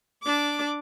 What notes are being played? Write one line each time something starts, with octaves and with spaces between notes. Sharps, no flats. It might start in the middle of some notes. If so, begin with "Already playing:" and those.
D4 D6